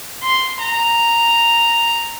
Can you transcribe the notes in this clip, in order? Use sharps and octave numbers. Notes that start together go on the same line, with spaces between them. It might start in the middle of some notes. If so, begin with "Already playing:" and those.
C6
A#5